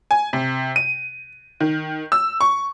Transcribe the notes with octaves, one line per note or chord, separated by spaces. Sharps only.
G#5
C3
D#7
D#3
E6
C#6